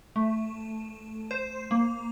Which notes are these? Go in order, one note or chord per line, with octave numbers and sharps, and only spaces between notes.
A3
C5
A#3